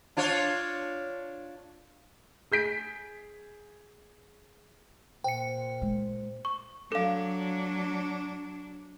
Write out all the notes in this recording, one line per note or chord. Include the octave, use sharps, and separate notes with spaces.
D4 F4 C#5
G#4 G6 B6 D7
A#2 C5 G5 C#7
G#3
C#6
F#3 D4 A4 F5